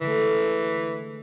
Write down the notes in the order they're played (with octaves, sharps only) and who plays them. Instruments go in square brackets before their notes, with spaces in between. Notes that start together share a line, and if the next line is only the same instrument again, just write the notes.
[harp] D3 G#3 A3 [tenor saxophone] E3